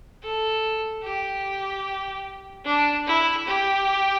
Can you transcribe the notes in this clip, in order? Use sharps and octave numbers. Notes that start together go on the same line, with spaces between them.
A4
G4
D4
E4
G4